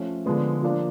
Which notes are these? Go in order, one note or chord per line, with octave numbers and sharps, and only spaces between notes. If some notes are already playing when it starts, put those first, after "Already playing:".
Already playing: F3 A3 C#4
D3 F3 G#3 B3
F3 A#3 D4